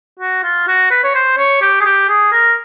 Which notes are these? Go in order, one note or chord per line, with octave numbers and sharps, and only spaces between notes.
F#4
F4
F#4
B4
C#5
C5
C#5
G4
G#4
G4
G#4
A#4